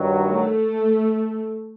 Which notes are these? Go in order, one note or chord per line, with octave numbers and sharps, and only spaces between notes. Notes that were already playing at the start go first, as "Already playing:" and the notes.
Already playing: G2 D#3 F#3
A3